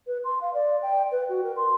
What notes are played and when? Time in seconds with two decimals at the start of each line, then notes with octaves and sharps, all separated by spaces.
0.07 B4
0.24 C6
0.41 F5
0.54 D5
0.82 G5
1.12 B4
1.29 F#4
1.44 A#4
1.56 C6